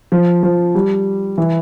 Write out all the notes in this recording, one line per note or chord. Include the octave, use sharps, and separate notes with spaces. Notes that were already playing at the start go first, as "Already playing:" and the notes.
F3
F3
G3
E3